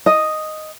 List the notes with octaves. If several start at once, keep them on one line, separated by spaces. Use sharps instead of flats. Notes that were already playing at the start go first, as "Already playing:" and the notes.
D#5